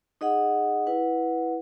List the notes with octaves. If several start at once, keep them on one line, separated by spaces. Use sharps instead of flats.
D#4 G#4 D#5 F#5
E4 B4 F#5